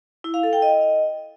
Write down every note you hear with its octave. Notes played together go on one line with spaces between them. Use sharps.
E4
F5
A4
G5
D#5